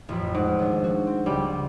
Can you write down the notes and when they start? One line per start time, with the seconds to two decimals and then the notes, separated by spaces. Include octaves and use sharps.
0.09 A1 F2 B5
0.35 G#2 F#5
0.59 D#2 D4
0.81 F3 F#4
1.07 C4
1.26 C#2 G3